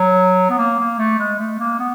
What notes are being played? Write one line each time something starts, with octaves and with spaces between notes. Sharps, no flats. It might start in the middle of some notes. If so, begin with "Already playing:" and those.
Already playing: F#3
B3
A#3
A#3
A3
G#3
A3
A#3
B3